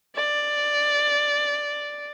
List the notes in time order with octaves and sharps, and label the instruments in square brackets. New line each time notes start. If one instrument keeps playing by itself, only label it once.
[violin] D5